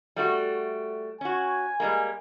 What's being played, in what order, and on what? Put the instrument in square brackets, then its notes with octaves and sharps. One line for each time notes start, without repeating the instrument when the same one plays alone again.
[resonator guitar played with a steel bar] G3 A3 F#4
[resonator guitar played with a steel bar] C#4 F#4 [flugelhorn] G#5
[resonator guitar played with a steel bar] G3 G#3 A#3